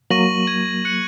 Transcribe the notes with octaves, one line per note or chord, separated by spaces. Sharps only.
F#3 A#3 C#6 A#6 D#7 F#7
G#6 D#7 F#7
F#6 C#7 F#7